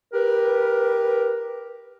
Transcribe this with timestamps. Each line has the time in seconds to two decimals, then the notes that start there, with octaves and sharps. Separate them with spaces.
0.13 G4 A#4 B4